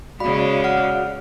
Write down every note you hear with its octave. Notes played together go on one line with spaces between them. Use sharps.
C#3 G#3 F#4 D5 F5 B5
F#5 F6